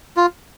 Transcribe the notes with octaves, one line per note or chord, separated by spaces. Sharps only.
F4